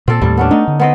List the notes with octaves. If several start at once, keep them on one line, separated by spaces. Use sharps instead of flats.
A#2 C4 A4
D#2 A2 G3
B3 C#4 D4
A3 D4 D#4
D3
B3 C4 D#5